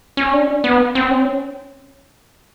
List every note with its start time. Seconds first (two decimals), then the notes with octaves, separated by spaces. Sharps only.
0.17 C#4
0.33 D4
0.64 B3
0.95 C4
1.11 C#4